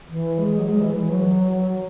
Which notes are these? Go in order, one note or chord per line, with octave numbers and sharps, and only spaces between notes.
E3
G#3
F#3
G#3
E3
E3
F#3
F#3